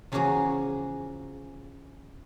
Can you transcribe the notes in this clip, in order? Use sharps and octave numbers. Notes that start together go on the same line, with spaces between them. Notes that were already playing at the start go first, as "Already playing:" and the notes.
E2 C#3 F3 A#3 F#4 G#4